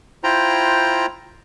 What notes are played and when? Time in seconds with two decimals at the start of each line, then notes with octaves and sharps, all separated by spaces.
0.24 E4 F4 C5 G5 A#5